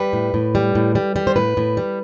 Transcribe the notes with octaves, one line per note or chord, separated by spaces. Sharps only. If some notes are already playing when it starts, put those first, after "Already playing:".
Already playing: G3 B4
A2
A2
G3
A2
G3
G3
C5
A2 B4
A2
G3